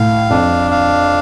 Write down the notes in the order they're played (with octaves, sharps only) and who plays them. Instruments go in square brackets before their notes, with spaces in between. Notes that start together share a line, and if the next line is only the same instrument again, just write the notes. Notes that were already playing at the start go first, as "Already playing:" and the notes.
Already playing: [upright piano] A2 [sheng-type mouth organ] F5
[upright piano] F2 [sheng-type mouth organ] D4
[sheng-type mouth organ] F5